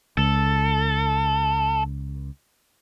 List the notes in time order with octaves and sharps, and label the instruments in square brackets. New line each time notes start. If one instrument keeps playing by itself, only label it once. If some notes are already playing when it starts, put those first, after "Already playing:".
[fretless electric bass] C#2 [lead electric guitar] A4